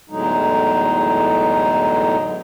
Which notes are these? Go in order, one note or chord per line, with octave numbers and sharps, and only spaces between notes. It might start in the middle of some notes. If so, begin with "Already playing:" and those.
E2 A2 D3 F#3 G#3 D#4